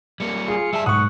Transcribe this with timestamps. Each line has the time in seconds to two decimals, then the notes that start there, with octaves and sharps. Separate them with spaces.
0.20 G3 A#3 C#7
0.48 F4 G#4
0.73 G3 E5 A5
0.86 B1 G#2 F#5 C#6 D#6